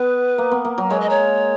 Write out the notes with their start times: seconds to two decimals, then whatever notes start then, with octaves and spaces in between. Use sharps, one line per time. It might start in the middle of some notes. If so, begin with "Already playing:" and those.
Already playing: B3 B4
0.38 A#3
0.51 B3
0.65 A#3
0.78 F#3
0.90 G#3 C#5
1.01 D#5
1.10 C#5